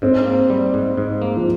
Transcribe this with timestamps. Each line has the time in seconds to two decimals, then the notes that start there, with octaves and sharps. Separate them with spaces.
0.02 G#2 C4
0.26 A#3
0.50 G3
0.74 G#2
0.97 G#2
1.22 A#3
1.36 F3